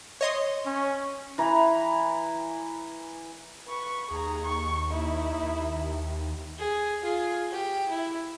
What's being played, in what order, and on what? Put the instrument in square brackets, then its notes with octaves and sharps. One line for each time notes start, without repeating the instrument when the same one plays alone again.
[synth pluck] C#5 D#5 C6
[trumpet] C#4
[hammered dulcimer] E3 A#5
[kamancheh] B4 C#6
[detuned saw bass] D#2 [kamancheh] G#4 A#5
[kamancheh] C#6
D#4 E4
[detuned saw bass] D#2
[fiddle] G#4
F4 G#4
G4
E4